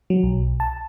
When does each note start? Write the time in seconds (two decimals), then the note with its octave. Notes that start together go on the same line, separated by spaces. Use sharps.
0.10 F#3
0.23 B1
0.60 A5